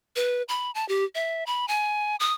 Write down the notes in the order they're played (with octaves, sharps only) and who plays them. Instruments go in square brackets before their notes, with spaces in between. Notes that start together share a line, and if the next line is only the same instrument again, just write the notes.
[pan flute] B4
B5
A5
G4
E5
B5
G#5
D#6